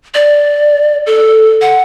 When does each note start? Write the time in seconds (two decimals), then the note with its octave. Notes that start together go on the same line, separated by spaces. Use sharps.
0.14 D5
1.06 A4
1.62 F#5